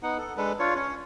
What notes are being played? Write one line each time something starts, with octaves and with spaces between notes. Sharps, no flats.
B3 D#4 F#5
A4
G#3 D4 A4 B4
D4 F4 C#5
C#4 C#5